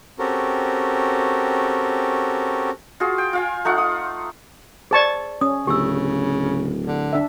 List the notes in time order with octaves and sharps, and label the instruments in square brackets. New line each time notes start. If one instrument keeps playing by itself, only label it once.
[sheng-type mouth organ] C4 C#4 F#4 G4 A4 A#4
[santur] F4 F#4 G#4
G5
F4 F5 G#5
A3 D#4 F4 F#5
D#6
[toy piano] G#4 D5 [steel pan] C5 A5 C#6
[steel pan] C#4 [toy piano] D#6
[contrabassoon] D1 [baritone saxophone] C#3 [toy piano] G4 E6
[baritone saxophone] D3
[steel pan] D4 E5